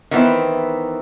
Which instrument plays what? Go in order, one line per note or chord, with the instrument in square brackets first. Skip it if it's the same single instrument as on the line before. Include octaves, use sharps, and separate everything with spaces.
[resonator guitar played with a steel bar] D#3 E3 B3 C4 E4